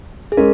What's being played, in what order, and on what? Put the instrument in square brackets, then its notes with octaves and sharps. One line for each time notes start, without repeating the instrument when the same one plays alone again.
[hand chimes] G#4
[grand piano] G#3 C#4 [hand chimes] A#4